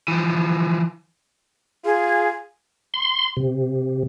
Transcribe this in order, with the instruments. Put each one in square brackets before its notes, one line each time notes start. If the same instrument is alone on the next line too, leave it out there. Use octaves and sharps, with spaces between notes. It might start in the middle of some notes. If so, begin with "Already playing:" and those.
[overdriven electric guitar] E3 F3
[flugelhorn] F4 [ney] G#4
[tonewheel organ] C6
C3